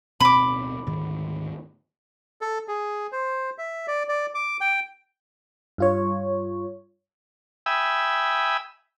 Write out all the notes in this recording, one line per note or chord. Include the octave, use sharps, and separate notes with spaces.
D1 B2 C4 B5 D6
D2 G#2 D#3
A4
G#4
C5
E5
D5
D5
D6
G5
G2 F4 C#5
E5 G5 G#5 B5 D#6 E6